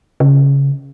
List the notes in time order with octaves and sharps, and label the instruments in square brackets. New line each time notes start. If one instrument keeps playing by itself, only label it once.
[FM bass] C#3